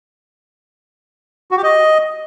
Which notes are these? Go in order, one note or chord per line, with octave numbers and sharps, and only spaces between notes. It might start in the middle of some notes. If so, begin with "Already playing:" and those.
F#4
G4
D#5